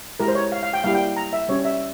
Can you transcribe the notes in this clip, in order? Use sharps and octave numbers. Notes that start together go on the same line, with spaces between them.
G#3 E4 G4 A#4
C5
C#5
F5
F5
G5
G3 A#3 E4 G4 F5
G5
A#5
E5
G3 C#4 G4 C#5
E5